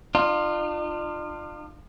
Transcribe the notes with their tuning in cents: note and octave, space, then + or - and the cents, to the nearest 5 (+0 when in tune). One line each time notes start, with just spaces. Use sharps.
D4 +45 F4 +0